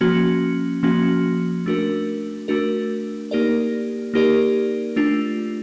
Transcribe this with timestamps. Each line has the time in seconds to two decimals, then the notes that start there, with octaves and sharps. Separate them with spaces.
0.01 F3 A#3 C#4 F#4
0.83 F3 A#3 C#4 F#4
1.66 A3 D4 F#4 A#4
2.48 A3 D4 F#4 A#4
3.31 A#3 D#4 G4 A#4 D5
4.14 A#3 D#4 G4 A#4 D5
4.96 A3 D4 F4